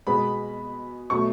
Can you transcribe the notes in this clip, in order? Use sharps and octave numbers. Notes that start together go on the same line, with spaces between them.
B2 G#3 B3 B5
B2 F#3 A3 C#6